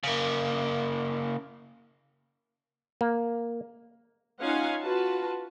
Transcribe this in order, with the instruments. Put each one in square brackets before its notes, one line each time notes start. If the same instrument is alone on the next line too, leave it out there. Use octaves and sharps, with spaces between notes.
[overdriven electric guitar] C#3 A#3
[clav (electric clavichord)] A#3
[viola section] C#4 D#4 F4 F5 F#5 G#5
F4 F#4 B4 A5